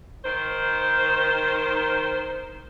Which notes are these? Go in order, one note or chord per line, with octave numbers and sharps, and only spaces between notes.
D#3 C5